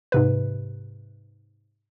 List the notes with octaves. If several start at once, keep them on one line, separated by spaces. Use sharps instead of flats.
G#2 C3 B4